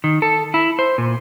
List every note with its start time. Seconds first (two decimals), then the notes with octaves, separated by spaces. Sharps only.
0.04 D#3
0.22 A4
0.54 E4
0.79 C5
0.98 A#2